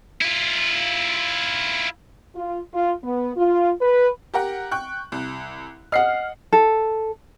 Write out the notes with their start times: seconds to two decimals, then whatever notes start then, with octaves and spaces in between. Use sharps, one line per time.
0.22 E4 F4
2.35 F4
2.73 F4
3.04 B3
3.36 F4
3.81 B4
4.34 G4 A#4 F#5
4.71 G5 C#6 F#6
5.12 C2
5.92 D#5 F#5 F6 C7
6.53 A4